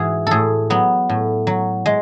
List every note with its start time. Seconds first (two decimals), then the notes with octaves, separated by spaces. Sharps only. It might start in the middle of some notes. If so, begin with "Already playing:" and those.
Already playing: G#2 E3 F#4 G#4
0.27 A2 G#4 A4
0.70 F#3 B3
1.09 A2
1.47 F#3
1.86 G#3